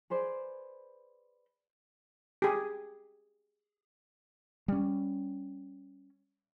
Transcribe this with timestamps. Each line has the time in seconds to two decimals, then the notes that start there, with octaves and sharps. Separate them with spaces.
0.10 G#4 B4 C5 D5
2.42 G4 G#4
4.68 G3 C#4